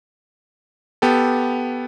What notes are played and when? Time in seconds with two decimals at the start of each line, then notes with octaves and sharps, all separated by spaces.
1.02 B3 G4 A4